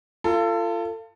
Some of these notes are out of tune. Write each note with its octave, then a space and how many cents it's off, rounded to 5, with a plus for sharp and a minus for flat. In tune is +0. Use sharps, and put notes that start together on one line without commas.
F4 -25 A4 +25